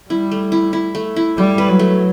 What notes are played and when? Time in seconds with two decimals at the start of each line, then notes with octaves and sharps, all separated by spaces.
0.10 G3 E4
0.31 A3
0.52 E4
0.73 E4
0.95 A3
1.16 E4
1.37 G3 A3
1.58 B4
1.69 F#3
1.79 A3